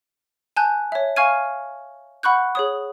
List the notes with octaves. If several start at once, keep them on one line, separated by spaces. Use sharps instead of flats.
G#5 A5 F#6 G6
C#5 E5
F5 G#5 C#6 F6 G#6 D#7
F#5 B5 C#6 F#6 G6
G#4 C#5 D#6